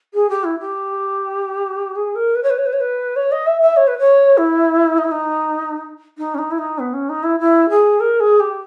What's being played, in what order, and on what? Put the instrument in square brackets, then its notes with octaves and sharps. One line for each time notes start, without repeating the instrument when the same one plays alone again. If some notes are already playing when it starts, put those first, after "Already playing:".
[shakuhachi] G#4
G4
E4
G4
G#4
A#4
B4
C#5
B4
C#5
B4
C#5
B4
C#5
D#5
E5
E5
C#5
B4
C#5
E4
D#4
E4
D#4
D#4
C#4
D#4
E4
D#4
B3
C#4
D#4
E4
E4
G#4
A#4
G#4
G4